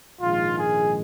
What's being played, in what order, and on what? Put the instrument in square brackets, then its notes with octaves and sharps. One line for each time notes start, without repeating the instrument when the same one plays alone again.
[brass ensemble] A#1 G#2 D#3 G#3 F4
G#4